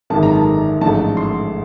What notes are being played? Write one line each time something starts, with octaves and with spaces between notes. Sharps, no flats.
G#1 F#2 D#3 G#3 A5
A#5
A5
A1 G#2 F3 A3 D4 A5
C6